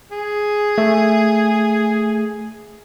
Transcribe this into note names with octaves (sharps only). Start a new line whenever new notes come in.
G#4
A3